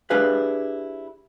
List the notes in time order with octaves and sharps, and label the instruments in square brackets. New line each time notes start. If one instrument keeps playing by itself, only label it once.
[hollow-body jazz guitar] D4 E4 G4 G#4 B4 F5